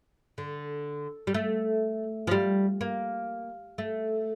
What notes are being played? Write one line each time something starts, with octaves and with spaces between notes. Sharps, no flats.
D3
G3
A3
F3
G3
A#3
A3